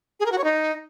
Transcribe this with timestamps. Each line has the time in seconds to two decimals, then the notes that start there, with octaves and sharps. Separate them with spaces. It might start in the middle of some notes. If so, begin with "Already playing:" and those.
0.20 G#4
0.26 A#4
0.32 F#4
0.38 C#5
0.44 D#4